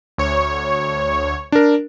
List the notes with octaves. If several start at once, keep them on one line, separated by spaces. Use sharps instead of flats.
D2 C#5
D4 A#4